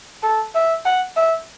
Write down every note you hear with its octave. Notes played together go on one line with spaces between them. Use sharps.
A4
E5
F#5
E5